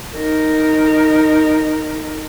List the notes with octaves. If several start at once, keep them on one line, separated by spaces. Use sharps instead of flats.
D#4 A#4